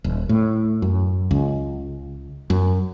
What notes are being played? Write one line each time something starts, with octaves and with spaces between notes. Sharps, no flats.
D#1
A2
F#2
C#2
F#2